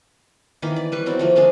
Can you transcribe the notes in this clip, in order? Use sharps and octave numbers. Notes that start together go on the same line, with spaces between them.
D#3 E3 A#3 B5
D5
G3 B4 C#6
F#3 C4 E4 D5
F3 A3 A#3
G#3 A#3 D4 G#4